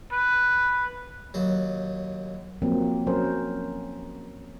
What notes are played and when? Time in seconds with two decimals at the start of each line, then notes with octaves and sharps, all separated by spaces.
0.12 B4
1.34 D#2 F#3
2.62 F3 F#3 A#3 C4
3.07 F#3 C#4 A#4 C5